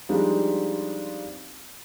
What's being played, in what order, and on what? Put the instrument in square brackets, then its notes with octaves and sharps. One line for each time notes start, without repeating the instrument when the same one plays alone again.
[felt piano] F3 G3 G#3 C4 D4 D#4